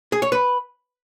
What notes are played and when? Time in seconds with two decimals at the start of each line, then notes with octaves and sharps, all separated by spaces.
0.12 G#4
0.22 C#5
0.32 B4